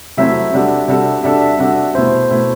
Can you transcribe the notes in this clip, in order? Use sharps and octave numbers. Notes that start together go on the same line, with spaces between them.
C3 F#3 A3 C4 E4 E5
C3 G3 D4 F#4 A4
C3 G3 D4 F#4 A4
C3 G3 D4 F#4 A4 E5
E5
C3 G3 D4 F#4 A4
B2 A3 E4 C5
B2 A3 E4